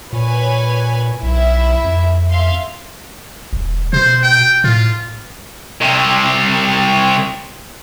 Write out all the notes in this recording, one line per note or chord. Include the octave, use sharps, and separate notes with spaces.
A#2 B4 C#5 G#5
B1 E4 E5
F2
E5 F5 C6
E1
B2 C5
G5
A2 F4
C2 C3